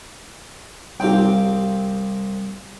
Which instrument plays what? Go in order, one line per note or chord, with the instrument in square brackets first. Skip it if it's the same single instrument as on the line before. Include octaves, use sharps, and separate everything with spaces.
[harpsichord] C2 C4 F5 [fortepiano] G4 G5